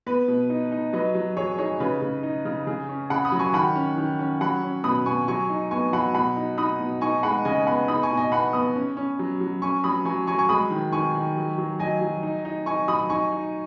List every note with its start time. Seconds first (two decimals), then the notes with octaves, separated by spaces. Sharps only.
0.06 B3 B4
0.28 B2
0.50 D#4
0.72 D#4
0.93 F#3 B4 D#5
1.15 F#3
1.36 F#3 G#4 C#5
1.58 D#4 G#4 C#5
1.80 C#3 B4
2.02 C#3
2.23 D#4
2.45 C#3
2.67 C#3 G#4
2.89 C#4
3.10 C#3 F#5 B5
3.25 B5 D#6
3.32 F#3
3.39 G#5 C#6
3.54 D#3 F#5 B5
3.75 C#4
3.97 D#3
4.19 C#4
4.41 F#3 F#5 B5
4.63 C#4
4.84 B2 B5 D#6
5.06 B2 G#5 C#6
5.28 F#3 G#5 C#6
5.49 D#4
5.71 B3 G#5 C#6
5.93 F#3 F#5 B5
6.15 B2 F#5 B5
6.36 D#4
6.58 D#4 B5 D#6
6.80 B2
7.01 D#4 G#5 C#6
7.23 G#3 F#5 B5
7.45 C#3 D#5 G#5
7.67 B3 F#5 B5
7.88 D#4 B5 D#6
8.03 G#5 C#6
8.10 B2
8.17 D#5 G#5
8.32 B3 F#5 B5
8.53 B3 B5 D#6
8.76 C#4
8.97 C#4
9.19 F#3
9.41 F#3
9.62 C#4 G#5 C#6
9.84 F#3 B5 D#6
10.05 F#3 G#5 C#6
10.27 F#3 G#5 C#6
10.38 G#5 C#6
10.49 G#3 B5 D#6
10.70 D#3
10.92 D#3 G#5 C#6
11.15 D#3
11.37 F#3
11.58 F#3
11.79 F#3 D#5 G#5
12.01 F#3
12.23 D#4
12.45 D#4
12.66 D#4 G#5 C#6
12.88 F#3 B5 D#6
13.10 D#4 G#5 C#6
13.32 D#4